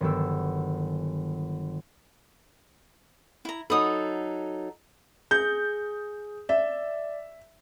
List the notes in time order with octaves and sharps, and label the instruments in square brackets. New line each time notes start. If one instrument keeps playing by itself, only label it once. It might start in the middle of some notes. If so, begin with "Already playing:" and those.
[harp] G1 D#3 F#3 B3 G4 E6
[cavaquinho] E4 A#5
[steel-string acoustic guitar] F#3 D#4 A4 [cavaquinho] B5 D#6
[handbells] G#4 [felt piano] G6
[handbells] D5 [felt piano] E5